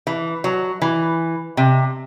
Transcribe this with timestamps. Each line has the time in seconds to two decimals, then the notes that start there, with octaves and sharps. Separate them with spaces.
0.07 E3
0.44 F#3
0.82 E3
1.57 C3